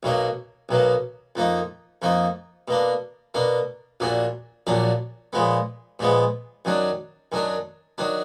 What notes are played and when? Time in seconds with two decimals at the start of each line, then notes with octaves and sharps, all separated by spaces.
0.03 B1 B2 F#3 A#3
0.69 B1 B2 F#3 A#3
1.36 F2 F3 A#3 D#4
2.02 F2 F3 A#3 D#4
2.68 B2 A#3 D4
3.34 B2 A#3 D4
4.00 A#1 A#2 F#3 D4
4.67 A#1 A#2 F#3 D4
5.33 A#2 F3 G#3 B3
5.99 A#2 F3 G#3 B3
6.65 F#2 D#3 F#3 D4
7.32 F#2 D#3 F#3 D4
7.98 D#3 F#3 D4